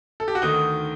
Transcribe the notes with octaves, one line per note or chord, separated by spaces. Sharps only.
A4
G4
F#4
D2 D3 D#3 D#4